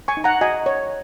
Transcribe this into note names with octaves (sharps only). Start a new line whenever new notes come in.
G#5 C#6
D#4
F#5 A#5
F#4 D#5 G#5
C#5